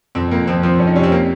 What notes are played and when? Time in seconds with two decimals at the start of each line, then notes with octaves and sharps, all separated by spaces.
0.15 F2 C4
0.31 F2 A#3
0.47 F3 C4
0.63 F3 C4
0.79 F2 C#4
0.87 D#4
0.95 C3 C#4
1.03 C4
1.12 A#3